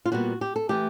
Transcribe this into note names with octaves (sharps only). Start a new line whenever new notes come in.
F4
A#2 G3 B3 F#4
G4
A4
E3 A3 G4